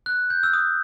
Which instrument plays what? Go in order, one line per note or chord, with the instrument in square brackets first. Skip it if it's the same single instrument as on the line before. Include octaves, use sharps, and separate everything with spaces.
[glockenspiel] F#6
G6
E6
D#6